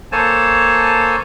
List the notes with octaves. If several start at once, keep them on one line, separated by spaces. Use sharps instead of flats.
A#3 A4 C5 C#5 G#5 A5